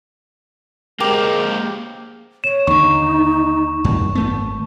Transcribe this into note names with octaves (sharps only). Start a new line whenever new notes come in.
G#3 A#3 C4 G4
C#5 E7
D#2 D3 D#4 C#6
F#2
G#1 A3 B3 A5